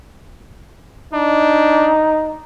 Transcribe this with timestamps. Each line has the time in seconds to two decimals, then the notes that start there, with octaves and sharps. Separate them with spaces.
1.13 D4 D#4